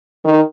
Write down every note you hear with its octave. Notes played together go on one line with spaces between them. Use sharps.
D#3